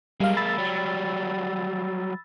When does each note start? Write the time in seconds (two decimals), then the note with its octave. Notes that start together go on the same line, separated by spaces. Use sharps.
0.20 G3 G#3 A#3 F5
0.37 B5 E6 A6
0.58 F#3 G3